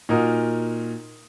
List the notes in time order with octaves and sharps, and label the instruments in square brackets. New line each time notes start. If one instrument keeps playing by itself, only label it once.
[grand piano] A#2 D#4 F#4 A#4 D#6